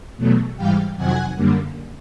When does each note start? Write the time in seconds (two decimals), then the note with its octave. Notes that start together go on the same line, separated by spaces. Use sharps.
0.17 E2 B2 F#3 A3
0.57 G#2 E3 G3 F5 G5
0.96 F2 C3 D#3 F#3 F#5 G#5
1.36 F#2 D3 G3 A#3